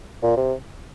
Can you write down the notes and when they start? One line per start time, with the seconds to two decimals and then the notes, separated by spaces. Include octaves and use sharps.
0.22 A#2
0.37 C3